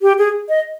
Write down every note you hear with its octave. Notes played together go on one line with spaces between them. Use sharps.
G4
G#4
D#5